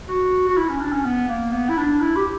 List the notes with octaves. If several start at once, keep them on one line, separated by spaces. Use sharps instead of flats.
F#4
F#4
E4
C#4
D4
C#4
B3
A#3
B3
E4
D4
E4
G4